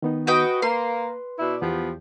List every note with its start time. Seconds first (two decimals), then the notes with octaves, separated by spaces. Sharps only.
0.02 D#3 B3 D#4
0.27 F#4 B4 D#5 G5
0.62 A#3 B4 C6
1.39 B2 E4 D5
1.62 E2 F3 B3 G4